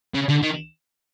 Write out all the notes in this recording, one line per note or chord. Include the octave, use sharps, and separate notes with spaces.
C#3
D3
D#3